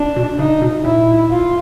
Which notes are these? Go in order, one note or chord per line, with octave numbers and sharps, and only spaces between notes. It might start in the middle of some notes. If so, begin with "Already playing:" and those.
Already playing: D4
B2
C#3 D#4
B2
A#2 E4
F4